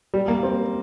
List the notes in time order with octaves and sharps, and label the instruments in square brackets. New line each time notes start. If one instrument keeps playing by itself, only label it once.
[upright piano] G3
A#3
C4